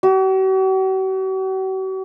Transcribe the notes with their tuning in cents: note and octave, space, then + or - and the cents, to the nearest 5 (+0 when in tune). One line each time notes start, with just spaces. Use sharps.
F#4 +45